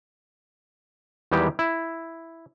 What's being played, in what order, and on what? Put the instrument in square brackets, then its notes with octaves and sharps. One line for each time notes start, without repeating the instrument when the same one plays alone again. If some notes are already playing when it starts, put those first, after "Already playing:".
[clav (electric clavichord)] E2 D#3 E3 G3 G#3 G4
E4